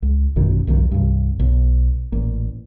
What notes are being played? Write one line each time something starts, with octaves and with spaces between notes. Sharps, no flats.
C#2
A1 F#2 B2 D#3
B1 E2 G2 D#3
C2 G2
B1
A1 A#2